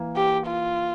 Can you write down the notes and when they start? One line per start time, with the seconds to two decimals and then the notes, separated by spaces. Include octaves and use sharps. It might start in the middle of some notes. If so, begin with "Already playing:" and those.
Already playing: E3 A#3
0.17 G4
0.47 F4